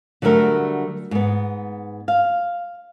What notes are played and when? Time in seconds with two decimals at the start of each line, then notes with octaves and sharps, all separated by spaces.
0.22 D3 F#3 G3 A3 A#4
1.11 G#2 B3
2.08 F5